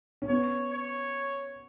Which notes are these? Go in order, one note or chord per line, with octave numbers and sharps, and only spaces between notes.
C#4
B3 C#5
C#5